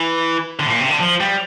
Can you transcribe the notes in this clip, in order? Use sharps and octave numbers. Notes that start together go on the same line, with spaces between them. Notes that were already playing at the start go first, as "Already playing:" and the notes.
Already playing: E3
D3
A2
A#2
C3
D3
F3
G3